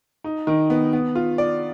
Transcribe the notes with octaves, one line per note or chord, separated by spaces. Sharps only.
D#4
D#3
B3
B3
F4
D5